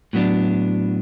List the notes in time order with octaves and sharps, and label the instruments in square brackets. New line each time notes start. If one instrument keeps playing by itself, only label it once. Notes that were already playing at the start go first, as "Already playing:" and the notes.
[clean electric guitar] A2 F#3 B3 D4